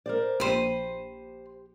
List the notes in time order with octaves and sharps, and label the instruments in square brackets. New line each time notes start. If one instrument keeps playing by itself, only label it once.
[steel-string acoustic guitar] A#4 C5 D5
[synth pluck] A#1 D#7 [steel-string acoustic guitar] G4 [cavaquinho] C5 B5